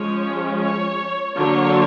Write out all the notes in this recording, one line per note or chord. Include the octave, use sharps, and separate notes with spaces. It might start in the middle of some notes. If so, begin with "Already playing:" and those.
Already playing: F3 G#3 C#4 C#5
C#5
D3 F#3 A#3 C#5